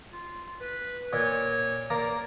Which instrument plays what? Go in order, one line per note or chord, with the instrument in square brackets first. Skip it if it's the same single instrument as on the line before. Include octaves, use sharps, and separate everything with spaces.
[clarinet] F4
B4
[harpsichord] A#2 [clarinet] C#5
[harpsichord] A#3 A#5 [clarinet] D5